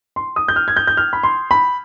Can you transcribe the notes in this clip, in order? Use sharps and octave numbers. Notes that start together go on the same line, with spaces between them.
C6
D#6
G6
F6
G#6
G6
G6
F6
B5
C6
B5